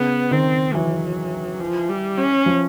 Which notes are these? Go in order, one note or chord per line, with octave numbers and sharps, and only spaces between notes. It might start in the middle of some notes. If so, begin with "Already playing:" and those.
Already playing: C#3 B3
D#3 C4
E3 F#3
F3
G3
C#4
F3